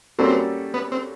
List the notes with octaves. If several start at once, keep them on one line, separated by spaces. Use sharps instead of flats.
G3 A#3 C4 C#4 F#4 A4
B3
C4